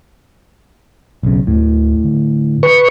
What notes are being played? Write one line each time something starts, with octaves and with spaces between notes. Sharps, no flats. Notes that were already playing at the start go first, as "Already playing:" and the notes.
B1 C#3
D2 A2
D3
B4 C#6